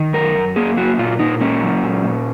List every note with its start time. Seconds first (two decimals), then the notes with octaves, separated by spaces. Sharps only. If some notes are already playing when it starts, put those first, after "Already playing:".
Already playing: D#3
0.13 F#2 A#4
0.35 F#2
0.56 A#3 G#4
0.77 F#3 F#4
0.98 A#2 F4
1.20 A#2 D#4
1.41 A#3 C#4
1.62 F#3
1.83 A#2
2.05 A#2